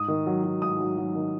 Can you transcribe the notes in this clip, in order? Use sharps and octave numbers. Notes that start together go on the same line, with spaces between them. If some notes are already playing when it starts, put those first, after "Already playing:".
Already playing: G#2 D#6
D#3
F#3
F#3
G#2 D#6
F#3
F#3
D#3